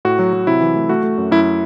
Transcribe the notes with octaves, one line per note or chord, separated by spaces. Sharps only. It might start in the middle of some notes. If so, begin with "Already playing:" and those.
A2 F#4
F#3
F#3
C3 E4
E3
A3
A3 F#4
A3
F#2
F#2 E4